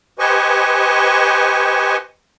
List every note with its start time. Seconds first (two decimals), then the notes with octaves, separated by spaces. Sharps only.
0.19 G4 B4 C5 D#5 G#5 C#6